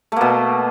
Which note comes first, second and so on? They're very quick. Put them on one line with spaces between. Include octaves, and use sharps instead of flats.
A3 A#3 B2